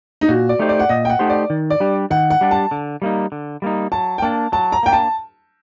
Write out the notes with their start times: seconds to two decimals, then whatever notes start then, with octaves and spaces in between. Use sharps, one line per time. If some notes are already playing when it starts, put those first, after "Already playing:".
0.21 D#4
0.28 A#2 F#4
0.49 D5
0.59 A3 D#4 G4 C5
0.69 D5
0.80 F#5
0.89 A#2 D#5
1.05 G5
1.10 F#5
1.19 A3 D#4 G4 C5
1.30 D5
1.50 D#3
1.70 D5
1.80 G3 D4 G4
2.10 D#3 F#5
2.30 F#5
2.41 G3 D4 G4
2.51 A5
2.71 D3
3.02 G3 A#3 D#4
3.32 D3
3.62 G3 A#3 D#4
3.92 F#3 A5
4.18 G5
4.22 A#3 D4 A5
4.52 F#3 A5
4.72 A#5
4.83 A#3 D4 G5
4.93 A5